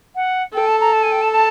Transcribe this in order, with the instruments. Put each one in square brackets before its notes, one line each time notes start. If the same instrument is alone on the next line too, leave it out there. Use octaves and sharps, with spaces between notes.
[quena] F#5
[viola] A4 [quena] G5
[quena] A5
A#5
A5
G#5
G5
A5
A5